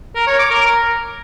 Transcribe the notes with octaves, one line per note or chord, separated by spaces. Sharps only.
A#4
C#5
D6
A#4